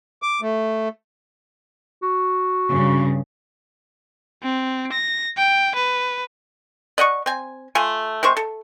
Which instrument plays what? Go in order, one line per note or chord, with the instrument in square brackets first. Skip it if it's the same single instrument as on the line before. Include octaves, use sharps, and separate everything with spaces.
[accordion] D6
A3
[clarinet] F#4
[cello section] G2 C#3
[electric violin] C4
A#6
G5
B4
[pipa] D5 D#5 F#5 C#6
C4 G#5
A3 F4 G#5
C3 G#3 C5 C#6
A4